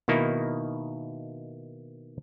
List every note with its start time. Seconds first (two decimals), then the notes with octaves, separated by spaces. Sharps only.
0.08 B2 D#3 A#3 D#4 E4